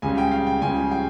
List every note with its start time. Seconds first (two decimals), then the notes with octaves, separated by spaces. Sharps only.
0.02 C#2 C#3 G3 G#5
0.18 G5
0.31 F5
0.47 G5
0.62 C#2 C#3 G3 G#5
0.91 G5